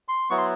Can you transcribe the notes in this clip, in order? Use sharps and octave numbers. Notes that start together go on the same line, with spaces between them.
C6
F#3 B3 E4 C#6
C6